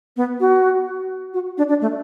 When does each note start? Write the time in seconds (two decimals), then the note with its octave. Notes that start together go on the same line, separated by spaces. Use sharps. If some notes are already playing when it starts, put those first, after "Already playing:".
0.17 B3
0.40 F#4
1.34 F#4
1.58 D4
1.69 D4
1.81 A3